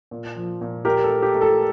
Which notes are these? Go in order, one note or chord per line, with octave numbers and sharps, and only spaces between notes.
A#2
F3
A#2
A#2 G4 A#4
A4
A3
G4
A3
A4